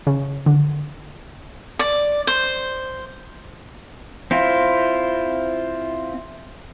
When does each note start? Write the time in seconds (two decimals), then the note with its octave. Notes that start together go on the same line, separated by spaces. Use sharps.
0.07 C#3
0.46 D3
1.79 D5
2.27 C5
4.31 C4 E4 F4